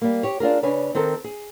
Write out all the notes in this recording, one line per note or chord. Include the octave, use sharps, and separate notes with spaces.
G3 A#3
G4 C#5
D4 F4 G#4 A#4
C#3 C#4 D4 B4 G#5
D#3 C4 A4 A#4
G#4